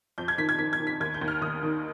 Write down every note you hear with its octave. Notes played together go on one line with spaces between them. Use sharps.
F2 G6
G#6
D#3 B6
G#6
D#3 B6
G#6
D#3
B6
D#2 G#6
G6
D#2
F6
D#2 D#6
D#3